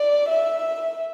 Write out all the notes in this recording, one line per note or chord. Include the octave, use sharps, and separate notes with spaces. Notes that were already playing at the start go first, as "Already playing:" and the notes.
Already playing: D5
E5